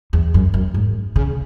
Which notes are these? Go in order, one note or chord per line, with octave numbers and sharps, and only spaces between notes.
E2
F#2
F#2
G#2
C#3